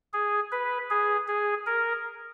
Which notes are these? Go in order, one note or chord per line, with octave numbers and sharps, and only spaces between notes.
G#4
B4
G#4
G#4
A#4